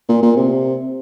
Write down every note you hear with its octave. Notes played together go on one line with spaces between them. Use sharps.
A#2
A#2
C3